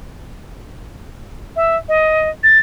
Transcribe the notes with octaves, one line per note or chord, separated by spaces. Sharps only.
E5
D#5
A6